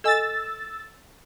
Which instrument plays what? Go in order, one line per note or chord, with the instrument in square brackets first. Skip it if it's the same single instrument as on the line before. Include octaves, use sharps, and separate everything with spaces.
[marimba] A4 D#5 G#5 [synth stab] E6 A6